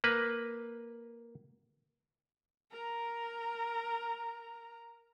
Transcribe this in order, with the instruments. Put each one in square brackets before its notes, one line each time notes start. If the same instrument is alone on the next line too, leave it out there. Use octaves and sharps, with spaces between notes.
[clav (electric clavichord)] A#3 B4
[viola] A#4 [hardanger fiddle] A#5